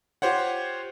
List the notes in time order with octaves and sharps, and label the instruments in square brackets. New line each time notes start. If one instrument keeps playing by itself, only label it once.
[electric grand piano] F4 G4 C5 C#5 F#5